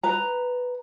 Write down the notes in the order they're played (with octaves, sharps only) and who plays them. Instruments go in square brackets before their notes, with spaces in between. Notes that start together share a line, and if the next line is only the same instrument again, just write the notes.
[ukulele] B4 A#5